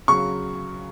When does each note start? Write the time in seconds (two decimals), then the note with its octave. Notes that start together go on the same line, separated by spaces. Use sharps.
0.08 C#3 F#3 C#6